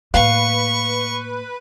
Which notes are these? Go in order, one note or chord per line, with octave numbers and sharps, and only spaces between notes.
A2 A#3 B4 F5 C#6